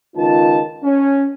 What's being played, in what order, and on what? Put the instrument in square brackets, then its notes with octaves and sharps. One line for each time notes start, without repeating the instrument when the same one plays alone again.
[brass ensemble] C#2 D#3 F4 A5
C#4